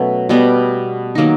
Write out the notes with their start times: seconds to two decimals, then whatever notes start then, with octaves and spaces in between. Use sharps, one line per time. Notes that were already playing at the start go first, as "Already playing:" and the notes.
Already playing: B2 F#3 A3 C#4
0.29 B2 G3 B3
1.15 D#3 F#3 A#3 D#4